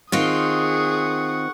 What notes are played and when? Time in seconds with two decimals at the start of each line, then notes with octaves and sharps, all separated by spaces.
0.12 D#3 C4 F4 G#4 F#5 C#6 D#6